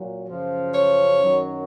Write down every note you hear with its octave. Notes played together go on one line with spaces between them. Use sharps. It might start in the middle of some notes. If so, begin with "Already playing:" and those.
Already playing: A#2 F#3
F#2 C#3 F3
C#5
F#2 D#3 F#3